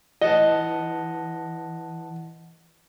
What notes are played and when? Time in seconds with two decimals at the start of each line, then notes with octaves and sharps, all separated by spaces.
0.21 E3 D#5 F#5 A5